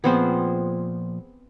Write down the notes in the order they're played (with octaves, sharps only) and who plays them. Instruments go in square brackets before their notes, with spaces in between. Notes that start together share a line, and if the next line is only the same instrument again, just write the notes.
[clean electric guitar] A#2 F3 C5 [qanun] B3 C4 G#4